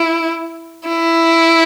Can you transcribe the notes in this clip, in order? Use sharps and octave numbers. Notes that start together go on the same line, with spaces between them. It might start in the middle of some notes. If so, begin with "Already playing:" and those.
Already playing: E4
E4